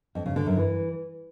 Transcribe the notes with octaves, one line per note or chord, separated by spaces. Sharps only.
F2
C#3
D3
F#2
E3